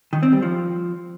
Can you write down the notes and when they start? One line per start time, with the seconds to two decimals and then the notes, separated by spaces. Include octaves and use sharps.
0.13 D#3
0.23 C4
0.33 G3
0.42 F3